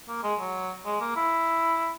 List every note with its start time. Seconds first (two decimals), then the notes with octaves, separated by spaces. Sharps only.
0.08 A#3
0.24 G#3
0.40 F#3
0.86 G#3
1.00 A#3
1.16 E4